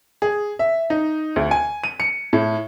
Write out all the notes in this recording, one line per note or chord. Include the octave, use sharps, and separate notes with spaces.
G#4
E5
D#4
D2
G#5
D#7
C#7
A2